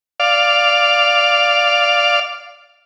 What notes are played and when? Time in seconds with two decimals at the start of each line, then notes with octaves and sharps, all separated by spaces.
0.20 D5 F5